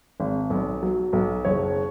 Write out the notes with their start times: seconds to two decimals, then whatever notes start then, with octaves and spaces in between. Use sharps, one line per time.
0.20 G#1
0.50 B1
0.83 F#3
1.13 B1
1.45 F#1 C#5